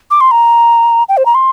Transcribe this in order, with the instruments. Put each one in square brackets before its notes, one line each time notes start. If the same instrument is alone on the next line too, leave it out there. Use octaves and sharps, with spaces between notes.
[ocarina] D6
C6
A#5
G5
C5
A#5
C6